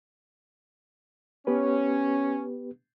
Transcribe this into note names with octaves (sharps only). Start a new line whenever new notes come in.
B3 C#4 G4 B4